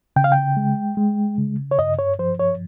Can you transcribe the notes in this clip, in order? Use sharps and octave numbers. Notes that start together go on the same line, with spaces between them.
C#3 G5
F5
G5
G#3
G#3
C#3
C#5
G2 D#5
C#5
F3 C5
C#5